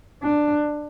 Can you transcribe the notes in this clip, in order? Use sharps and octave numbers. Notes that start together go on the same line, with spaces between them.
D4